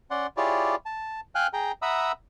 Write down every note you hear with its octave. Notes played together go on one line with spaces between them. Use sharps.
C#4 D5 F#5 C6
E4 F4 G4 G#4 C#5 D5
A5
F5 G5 G#5 F6 F#6
G#4 G5 A#5
E5 F#5 A#5 B5 D#6 E6